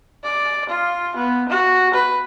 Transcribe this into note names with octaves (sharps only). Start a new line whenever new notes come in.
D5
F4
B3
F#4
B4